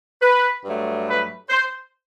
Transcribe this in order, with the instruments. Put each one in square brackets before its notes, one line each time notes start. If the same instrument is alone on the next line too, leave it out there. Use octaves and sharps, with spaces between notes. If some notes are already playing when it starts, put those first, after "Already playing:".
[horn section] B4
G2 F#3 A3
B4
C5